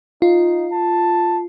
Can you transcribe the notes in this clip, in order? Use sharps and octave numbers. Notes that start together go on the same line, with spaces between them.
D#4 F4
A5